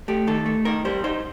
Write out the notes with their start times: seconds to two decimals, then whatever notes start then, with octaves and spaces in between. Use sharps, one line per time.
0.08 A3 G4
0.27 D#3 A4
0.46 A3
0.65 D#4 A#4
0.85 G3 C5
1.04 D#4 C5